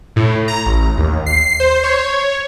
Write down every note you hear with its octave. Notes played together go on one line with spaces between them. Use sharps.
A2
A#5
A1
D#2
C7
C5
C#5